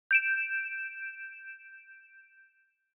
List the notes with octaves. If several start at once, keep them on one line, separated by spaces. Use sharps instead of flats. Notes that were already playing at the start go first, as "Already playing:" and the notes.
G6 D7 E7